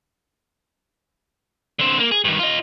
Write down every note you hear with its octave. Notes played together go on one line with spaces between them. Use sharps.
D3 C4
A#3
G#4
G2 D#3
F4 D#5